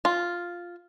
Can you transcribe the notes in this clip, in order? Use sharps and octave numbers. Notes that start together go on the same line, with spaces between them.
F4